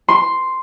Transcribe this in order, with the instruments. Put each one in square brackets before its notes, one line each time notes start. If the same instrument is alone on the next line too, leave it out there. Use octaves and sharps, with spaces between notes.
[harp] C6